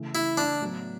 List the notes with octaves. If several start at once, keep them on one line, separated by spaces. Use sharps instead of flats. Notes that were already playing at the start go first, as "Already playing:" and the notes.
Already playing: C#3 E3 A3
E4
D4
A2 F#3 B3